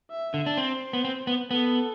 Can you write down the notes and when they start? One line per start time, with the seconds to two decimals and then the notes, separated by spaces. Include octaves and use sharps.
0.11 E5
0.34 D3
0.46 D4
0.57 C4 C5
0.93 B3
1.05 C4
1.27 B3
1.51 B3 A4